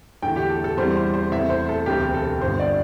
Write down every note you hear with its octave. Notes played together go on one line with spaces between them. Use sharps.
E2 D3 A3 G5
G4
A4
A4
E2 C3 G3 C5
C5
C5
E2 C3 A3 E5
C5
A4
E1 D2 C3 G4
A4
G1 G2 D3 A3 C5
D5